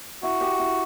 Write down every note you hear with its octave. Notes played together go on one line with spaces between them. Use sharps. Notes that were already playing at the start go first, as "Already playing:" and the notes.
E4 F#4
G4
E4